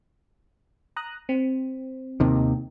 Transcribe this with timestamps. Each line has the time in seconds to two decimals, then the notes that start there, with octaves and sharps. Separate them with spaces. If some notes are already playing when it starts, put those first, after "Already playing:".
0.96 A#5 D#6 F#6
1.29 C4
2.20 D#2 C3 D#3